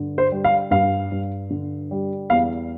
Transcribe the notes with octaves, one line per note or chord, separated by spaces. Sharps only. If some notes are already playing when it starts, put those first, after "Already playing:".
Already playing: G2 D3
C5
G3
F5
G2 F5
G2
D3
G3
E2 F5